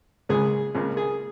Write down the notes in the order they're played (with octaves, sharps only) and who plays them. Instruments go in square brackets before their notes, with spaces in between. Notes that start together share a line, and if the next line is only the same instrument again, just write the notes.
[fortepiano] C#2 C#3 G#3 G#4
C#2 C#3 A#3
G#4